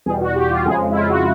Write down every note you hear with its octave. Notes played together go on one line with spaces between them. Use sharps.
E2 B2 G3 G#4
F#4
G4
F4
F2 C#3 F3 G#3 G#4
E4
F4
F#4